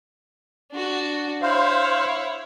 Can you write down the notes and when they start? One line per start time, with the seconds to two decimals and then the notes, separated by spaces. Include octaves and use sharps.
0.71 D4 F#4
1.42 E4 C5 C#5 F5